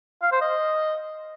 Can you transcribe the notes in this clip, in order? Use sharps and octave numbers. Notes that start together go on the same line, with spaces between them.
F5
C5
D#5